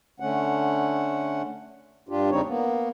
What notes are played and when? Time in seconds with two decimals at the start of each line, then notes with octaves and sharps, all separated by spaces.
0.20 D3 A3 C#4 F#5
2.09 G2 D4 F4 G4
2.30 E2 C#3 G3 C4 D#4 C#5
2.46 A#3 B3